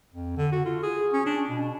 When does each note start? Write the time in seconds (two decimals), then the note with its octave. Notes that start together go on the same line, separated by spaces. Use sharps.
0.12 F2
0.37 D3
0.52 F#4
0.65 F4
0.83 G#4
1.12 C#4
1.26 D4
1.49 B2